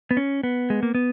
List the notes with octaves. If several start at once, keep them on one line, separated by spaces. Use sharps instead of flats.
B3
C#4
B3
G#3
A#3
B3